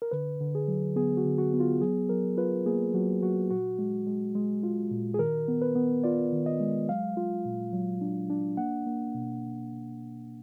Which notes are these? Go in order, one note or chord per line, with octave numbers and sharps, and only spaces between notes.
A#4
D3 B4
D3
G#4
F#3
B3 G#4
F#4
D3
F#4
B3
F4
F#3 G#4
F#3 A#4
F4 B4
A#3 G#4
F#3 F#4
F#3 F#4
A#2 F#4
G#3
G#3
G#3
F4
A#2
G#4
D#3 A#4
B3
B4
B3
F4 D5
D#3
D#5
G#3
F#3 F5
F4
A#2
F#3
D4
D4
A#3 F#5
A#3
B2